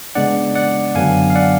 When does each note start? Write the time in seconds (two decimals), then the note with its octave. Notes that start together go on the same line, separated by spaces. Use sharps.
0.15 C#3 G#3 B3 D4 D5 F#5
0.55 D5 F#5
0.95 F#2 D3 F#3 B3 D4 F5 G#5
1.30 F5
1.35 D5 F#5